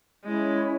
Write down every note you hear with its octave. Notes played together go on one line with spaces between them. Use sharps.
G#3 C#4 E4 G#4 C#5